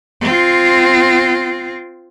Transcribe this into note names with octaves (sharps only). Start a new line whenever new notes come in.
C4 F4